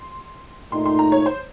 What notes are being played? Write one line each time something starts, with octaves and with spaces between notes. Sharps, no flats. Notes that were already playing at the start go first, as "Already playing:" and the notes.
Already playing: C6
A#2 A3 D#4 C6
C6
A#5
C#5
C5